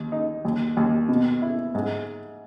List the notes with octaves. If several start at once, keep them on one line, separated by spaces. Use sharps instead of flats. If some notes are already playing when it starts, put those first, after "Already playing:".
Already playing: D#2
D#4
D#2
D#2
B2
E4
G#2